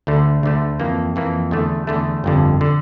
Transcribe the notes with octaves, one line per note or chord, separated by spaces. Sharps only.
D2 D3 A3
D2 D3 A3
F2 E3 A#3
F2 E3 A#3
E2 D3 A3
E2 D3 A3
G1 F2 D3
D3